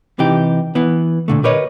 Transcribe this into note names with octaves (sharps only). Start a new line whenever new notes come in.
C3 E3 D#4 G4
E3 B3
A#2 D3 A3
G4 A#4 B4 C#5 D#5